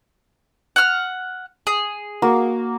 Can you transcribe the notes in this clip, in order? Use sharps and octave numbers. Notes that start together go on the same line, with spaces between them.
F#5 F6
G#4
A#3 F#4